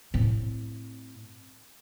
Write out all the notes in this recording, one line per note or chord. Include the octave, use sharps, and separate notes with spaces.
A2 C4